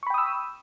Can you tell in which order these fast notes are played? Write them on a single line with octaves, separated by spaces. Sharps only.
C#6 B5 G5 D#6 E6